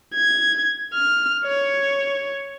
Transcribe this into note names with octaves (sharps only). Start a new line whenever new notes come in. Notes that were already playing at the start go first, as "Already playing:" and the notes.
G#6
F6
C#5